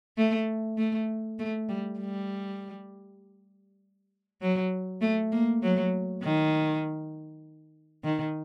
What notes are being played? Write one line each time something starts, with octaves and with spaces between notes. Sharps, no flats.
A3
A3
A3
G3
G3
F#3
A3
A#3
F#3
D#3
D#3